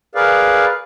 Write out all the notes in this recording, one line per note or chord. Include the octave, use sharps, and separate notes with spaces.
G#4 A#4 B4 D5 F5